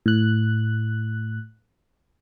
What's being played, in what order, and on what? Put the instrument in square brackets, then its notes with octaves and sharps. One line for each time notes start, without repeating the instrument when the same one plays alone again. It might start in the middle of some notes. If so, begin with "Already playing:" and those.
[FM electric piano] A2 F#6